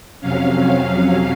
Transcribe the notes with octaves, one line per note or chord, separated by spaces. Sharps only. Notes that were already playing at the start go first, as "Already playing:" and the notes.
F2 C3 F#3 C#4 F5